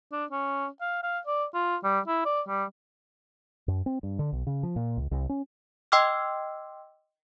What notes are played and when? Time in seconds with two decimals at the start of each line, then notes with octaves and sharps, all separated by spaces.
0.12 D4
0.31 C#4
0.81 F5
1.03 F5
1.27 D5
1.55 F4
1.84 G3
2.07 E4
2.25 D5
2.48 G3
3.68 F#2
3.86 C4
4.03 G2
4.19 D3
4.32 B1
4.47 C#3
4.63 F3
4.76 A#2
4.97 C#2
5.11 C2
5.29 C#4
5.92 D#5 G5 C6 D6 E6 F6